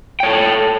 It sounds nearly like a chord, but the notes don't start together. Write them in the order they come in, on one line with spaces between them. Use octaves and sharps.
G5 C#5 A4